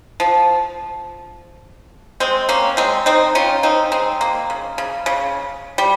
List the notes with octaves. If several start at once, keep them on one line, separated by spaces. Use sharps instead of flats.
F3
G#3 C4
A#3 C#4
G#3 C4
C4 D#4
C#4 F4
C4 D#4
G#3 C4
A#3
C#3
C#3
C#3
G3